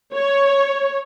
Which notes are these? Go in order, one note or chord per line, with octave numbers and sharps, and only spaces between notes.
C#5